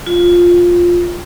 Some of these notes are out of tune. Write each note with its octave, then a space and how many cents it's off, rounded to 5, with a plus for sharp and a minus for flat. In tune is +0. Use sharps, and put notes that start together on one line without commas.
F4 +10